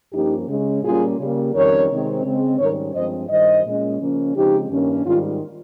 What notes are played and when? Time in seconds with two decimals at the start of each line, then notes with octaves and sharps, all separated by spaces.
0.12 G2 F3 A#3 C#4 D#4 G4
0.48 C#3 G#3 C#4
0.82 A#2 G3 A#3 C#4 F4 G#4
1.19 C#3 G3 A#3
1.53 F2 D#3 G3 C#4 A#4 C#5
1.89 C3 D#3 G#3 C4
2.24 C#3 G#3 C4
2.58 G#2 D#3 G3 C#4 A#4 C#5
2.94 G2 F3 G#3 C4 C5 D#5
3.29 G2 D#3 G3 C5 D#5
3.65 A#2 G#3 C#4
4.00 C#3 F3 A#3 C#4
4.35 C#3 F3 G#3 C4 D#4 G4
4.70 G2 D#3 A#3 C#4
5.05 G#2 D#3 G3 C#4 F4